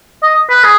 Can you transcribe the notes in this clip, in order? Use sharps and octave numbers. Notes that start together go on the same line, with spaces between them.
D#5
B4
G#4